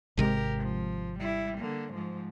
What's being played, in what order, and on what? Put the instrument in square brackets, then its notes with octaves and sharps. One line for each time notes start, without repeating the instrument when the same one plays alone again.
[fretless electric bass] G#1 C3 G#3 [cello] G4 A#4
[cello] F3
G3 E4
D3 A#3
G#2 F3